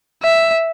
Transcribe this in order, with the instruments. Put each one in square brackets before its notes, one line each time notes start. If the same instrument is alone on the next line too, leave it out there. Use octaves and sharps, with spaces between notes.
[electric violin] E5